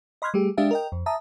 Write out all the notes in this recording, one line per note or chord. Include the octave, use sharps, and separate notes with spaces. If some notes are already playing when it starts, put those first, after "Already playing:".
D#5 B5 C6 F6 F#6 G#6
G3 A3 G4 G#4
G#3 D4 G4 E5 F5
A#4 D#5 G5
F2
E5 A5 A#5 D#6